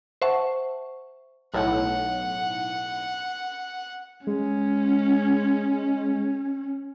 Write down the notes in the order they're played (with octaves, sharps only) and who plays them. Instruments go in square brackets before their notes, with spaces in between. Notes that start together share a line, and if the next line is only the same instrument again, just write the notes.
[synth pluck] C5 E5 F#5 A5 C#6
[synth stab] B1 A2 [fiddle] F#5
[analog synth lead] G#3 [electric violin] C#4